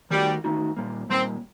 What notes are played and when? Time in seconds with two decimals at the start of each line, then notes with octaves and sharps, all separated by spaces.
0.11 D#3 G3 A3 D#4 F#4
0.44 D#3 A3 D#4 F#4
0.77 A#2 G3 A#3
1.09 A#2 G3 A#3 C4